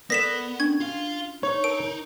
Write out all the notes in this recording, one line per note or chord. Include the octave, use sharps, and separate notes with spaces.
B3 A4 A#4 D5 A#6 B6 E7
C#4 D4 C#6 G#6
F4 F5
D#4 C5 C#5
A#4 A5 D7